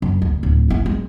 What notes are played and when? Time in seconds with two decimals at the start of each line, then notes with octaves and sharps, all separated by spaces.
0.02 F#2
0.22 D2
0.43 D1
0.68 B3 E4
0.86 G#3